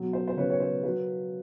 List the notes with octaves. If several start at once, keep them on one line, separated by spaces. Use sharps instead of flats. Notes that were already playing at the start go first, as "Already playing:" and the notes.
Already playing: B2 F#3
C5
C5
C#3 B4 C#5
C#5
C5
F#3 B4